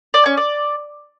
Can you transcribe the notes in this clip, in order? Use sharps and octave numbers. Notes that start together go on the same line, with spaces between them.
D5
C#4
D5